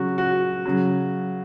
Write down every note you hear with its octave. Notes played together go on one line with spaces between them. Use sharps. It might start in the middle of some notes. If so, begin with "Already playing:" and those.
Already playing: C#3 F#3 F#4
F#4
C#3 F#3